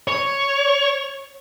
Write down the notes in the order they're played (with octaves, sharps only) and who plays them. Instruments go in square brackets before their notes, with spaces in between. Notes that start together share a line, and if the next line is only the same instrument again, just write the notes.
[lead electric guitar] C#5